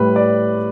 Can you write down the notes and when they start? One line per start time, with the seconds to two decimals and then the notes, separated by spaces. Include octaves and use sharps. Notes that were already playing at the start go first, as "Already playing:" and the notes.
Already playing: A2 G3 B4
0.16 D5